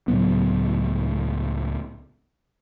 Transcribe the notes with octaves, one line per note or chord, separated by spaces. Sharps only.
C#2 A2 F#3 B3